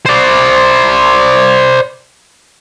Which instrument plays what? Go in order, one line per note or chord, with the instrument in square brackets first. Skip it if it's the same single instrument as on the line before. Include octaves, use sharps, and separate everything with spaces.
[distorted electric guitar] C5 D5